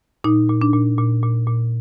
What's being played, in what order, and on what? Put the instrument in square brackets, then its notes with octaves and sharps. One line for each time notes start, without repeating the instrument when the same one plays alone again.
[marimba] A#2 D#4
A#2
D4
A#2
A#2
A#2
A#2